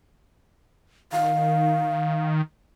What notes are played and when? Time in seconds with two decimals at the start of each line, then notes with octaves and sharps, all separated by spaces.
1.12 D#3 F5